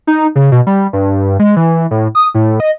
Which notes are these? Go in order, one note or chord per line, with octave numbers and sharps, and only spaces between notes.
D#4
C#3
B2
G3
G2
G#3
E3
A2
D#6
A2
D#5